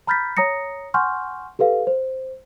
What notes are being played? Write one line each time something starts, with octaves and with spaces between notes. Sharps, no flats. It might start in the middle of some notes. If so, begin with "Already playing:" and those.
A#5 B5 F6 G6 A6 B6
C#5 A#5 D#6 A#6 C#7
F#5 G#5 C6 C#6 F6 G6
G4 A4 B4 F5
C5